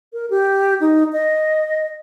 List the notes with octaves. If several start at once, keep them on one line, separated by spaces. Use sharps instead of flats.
A#4
G4
D#4
D#5